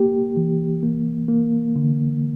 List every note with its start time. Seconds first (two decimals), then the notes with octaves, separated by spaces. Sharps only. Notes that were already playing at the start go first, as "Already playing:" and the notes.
Already playing: A#3 G4
0.37 E3
0.83 A#3
1.29 A#3
1.76 D3